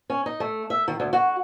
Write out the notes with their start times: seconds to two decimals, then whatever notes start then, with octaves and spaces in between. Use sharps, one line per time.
0.10 C#4
0.26 D#4
0.40 A3
0.70 E5
0.88 D#3
1.00 D2
1.13 F#4